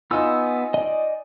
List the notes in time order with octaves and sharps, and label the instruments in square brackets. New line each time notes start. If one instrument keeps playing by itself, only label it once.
[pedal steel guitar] B3 E6 [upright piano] D#4 F4 [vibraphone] G#5
[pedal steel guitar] D5 D#5